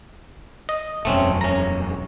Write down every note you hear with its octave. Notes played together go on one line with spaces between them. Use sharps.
D#5
E1 F#2 A3 C4 C#4
C#4 A#5